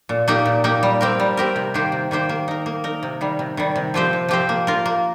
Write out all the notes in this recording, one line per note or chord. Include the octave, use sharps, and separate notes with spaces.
A#2
A#3 D#4 G4
A#2
A#3 D#4 G4
G3
C4 G4 A#4
G3
C4 G4 A#4
C3
D#3 A#3 G4 C5
C3
D#3 A#3 G4 C5
A#3
D#4 A#4
A#3
D#4 A#4
C3
D#3 G3
C3
D#3 G3
C3
F3 C4 G4 C5
C3
F3 C4 G4 C5
A#3
F4 A#4
A#3